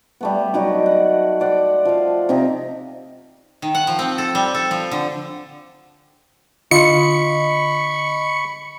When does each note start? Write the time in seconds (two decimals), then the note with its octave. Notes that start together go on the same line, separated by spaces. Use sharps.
0.21 G3 A3 B3
0.54 F#3 D#4 G4 D5
0.86 F#5
1.40 C5 D5 F#5 G5
1.85 F3 F5
2.29 C3 C4 D#4 E5
3.62 D#3
3.75 F#5
3.87 F3
3.99 C4
4.18 A4
4.35 G3
4.55 A4
4.71 F3
4.91 D3
6.71 D3 F4 D#5 B5 C#6 C#7